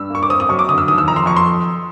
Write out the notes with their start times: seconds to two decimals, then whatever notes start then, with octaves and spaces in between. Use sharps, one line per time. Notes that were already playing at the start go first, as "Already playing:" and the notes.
Already playing: G2 E6
0.10 A#3 C#6
0.23 D6
0.29 C4 D#6
0.40 D#6
0.49 F#2 C#6
0.59 D6
0.69 D3 D#6
0.78 E6
0.88 D#2 D#6
0.98 E6
1.08 F2 A#5
1.16 C6
1.26 F2 C#6
1.37 C6